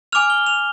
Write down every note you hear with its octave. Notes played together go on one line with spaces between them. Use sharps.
G#5 D6 F6 F7
G7
F7